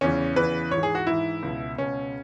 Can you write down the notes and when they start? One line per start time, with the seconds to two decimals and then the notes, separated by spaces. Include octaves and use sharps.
0.01 E2 C#3 E3 C#4
0.36 E2 C#3 E3 B4
0.71 G#2 E3 C#5
0.83 G#4
0.95 F#4
1.07 G#2 E3 E4
1.43 C#2 B2
1.78 C#2 B2 C#4